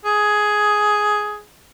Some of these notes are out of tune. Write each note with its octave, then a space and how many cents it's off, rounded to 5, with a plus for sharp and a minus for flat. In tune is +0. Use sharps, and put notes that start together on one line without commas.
G#4 +10